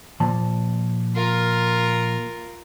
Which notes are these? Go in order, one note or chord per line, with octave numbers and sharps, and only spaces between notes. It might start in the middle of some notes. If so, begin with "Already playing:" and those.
A#2 F3 A5
F4 A#4